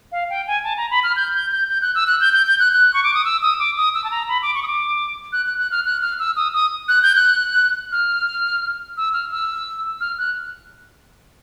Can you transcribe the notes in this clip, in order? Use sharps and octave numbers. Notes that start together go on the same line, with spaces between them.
F5
G5
G#5
A5
A#5
B5
F6
G6
G6
G6
G6
F#6
E6
F#6
G6
G6
G6
F#6
F#6
C#6
D6
D#6
E6
D#6
D6
D#6
E6
A5
A#5
B5
D6
C#6
D#6
D6
F#6
F#6
F#6
F6
F#6
F6
E6
D#6
D#6
F#6
G6
F#6
F6
E6
F6
E6
F6
F#6